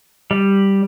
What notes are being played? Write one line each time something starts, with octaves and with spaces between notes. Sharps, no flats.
G3